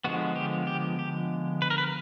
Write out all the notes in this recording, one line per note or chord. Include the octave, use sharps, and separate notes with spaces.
D3 F3 G#3 B3 F#4
G4
G4
G4
B4
A#4
B4